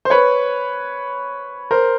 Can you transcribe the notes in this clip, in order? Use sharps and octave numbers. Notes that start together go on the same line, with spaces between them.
C5
B4 C#5
A#4 C5